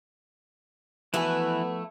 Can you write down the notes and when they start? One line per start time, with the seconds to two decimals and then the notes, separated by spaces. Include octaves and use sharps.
1.14 E3 F3 A3 B3 E4 F#4 B4 G#5